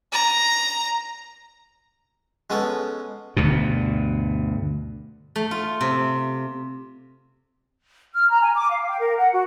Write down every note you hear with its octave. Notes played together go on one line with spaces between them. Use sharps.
A#5
G#3 B3 C#4 A4
D2 G2 B2
A3
F4
C3
F6
A#5
G#5
D6
F5
G5
A#4
F#5
F#4